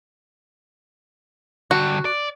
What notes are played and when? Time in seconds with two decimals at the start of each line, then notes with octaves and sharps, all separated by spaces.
1.71 D3 G3 F#4
2.05 D5